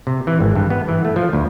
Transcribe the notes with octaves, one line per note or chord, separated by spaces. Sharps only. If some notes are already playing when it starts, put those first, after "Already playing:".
C3
E3
G#1
G2
B3
E3
A3
F3
D2